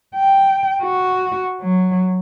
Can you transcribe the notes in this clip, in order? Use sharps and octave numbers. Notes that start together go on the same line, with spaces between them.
G5
F#4
F#3